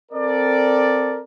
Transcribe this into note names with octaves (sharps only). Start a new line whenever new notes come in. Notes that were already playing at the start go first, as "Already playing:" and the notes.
C4 A4 A#4 D5